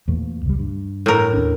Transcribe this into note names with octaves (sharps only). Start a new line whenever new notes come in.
E2 A#2 A3
C#2 G3
G2
A2 A#4
D#2 C#4 D4